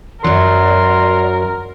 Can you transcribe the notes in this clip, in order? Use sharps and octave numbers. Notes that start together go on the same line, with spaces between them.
F#2 F#3 A#4 D5 C6